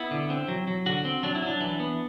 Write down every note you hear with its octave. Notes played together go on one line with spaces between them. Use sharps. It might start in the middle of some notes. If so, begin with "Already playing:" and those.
Already playing: B3 E4
D3
C4
F#3
F#3
D3 F#4
C4
F#3 D4
E4
F#3 D4
E3
B3